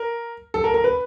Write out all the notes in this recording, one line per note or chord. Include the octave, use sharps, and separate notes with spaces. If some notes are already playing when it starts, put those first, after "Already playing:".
Already playing: A#4
A4
A#4
A#4
B4